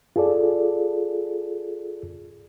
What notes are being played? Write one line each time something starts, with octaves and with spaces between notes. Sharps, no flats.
F4 G#4 A4 D5